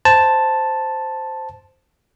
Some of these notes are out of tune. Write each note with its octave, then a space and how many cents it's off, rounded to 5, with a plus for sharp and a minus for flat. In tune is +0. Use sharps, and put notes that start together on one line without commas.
C5 -5 A5 +0